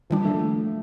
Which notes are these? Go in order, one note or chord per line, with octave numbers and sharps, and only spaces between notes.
D#3 F3 G3 D4
A3